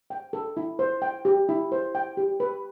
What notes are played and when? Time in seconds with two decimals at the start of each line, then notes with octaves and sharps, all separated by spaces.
0.10 G5
0.33 A4
0.57 E4
0.79 C5
1.02 G5
1.25 G4
1.49 E4
1.72 C5
1.95 G5
2.17 G4
2.40 B4